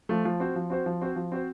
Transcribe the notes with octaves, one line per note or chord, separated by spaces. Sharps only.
F3 A3
F3
C4 F#4 C5
F3
C4 F#4 C5
F3
C4 F#4 C5
F3
C4 F#4 C5